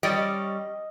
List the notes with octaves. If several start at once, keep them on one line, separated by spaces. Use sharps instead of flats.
G3 C#4 D5 D#5